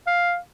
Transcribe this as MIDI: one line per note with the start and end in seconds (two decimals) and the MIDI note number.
0.07 0.38 77